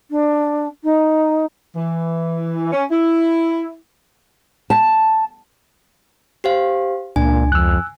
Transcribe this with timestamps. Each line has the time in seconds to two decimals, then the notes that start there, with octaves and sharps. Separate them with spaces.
0.11 D4
0.84 D#4
1.76 E3
2.73 C#4
2.91 E4
4.70 A5
6.44 G4 C5 F5
7.16 C#2 A#2 D4 G#5
7.52 F2 E6 F#6